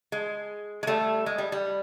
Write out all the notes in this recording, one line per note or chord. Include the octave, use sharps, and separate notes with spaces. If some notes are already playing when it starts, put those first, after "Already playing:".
G#3
G#3
G3 A3
G#3
G3
G3